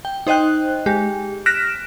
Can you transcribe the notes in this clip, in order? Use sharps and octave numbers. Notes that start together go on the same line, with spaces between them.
G5
D#4 C5 D#5 G5 F#6
G#3 G4
F6 F#6 A#6 B6 D7 E7